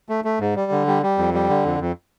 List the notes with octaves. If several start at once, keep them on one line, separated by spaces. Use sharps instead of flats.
A3
A3
G#2
G3
D3
G3
G3
F2
G3
D3
F2
F2